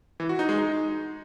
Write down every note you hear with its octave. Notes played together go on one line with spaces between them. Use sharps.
E3
F#4
D#4
G#3
D#4